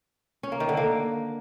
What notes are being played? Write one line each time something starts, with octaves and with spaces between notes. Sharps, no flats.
C#4
A#3
D#3
D3
A#3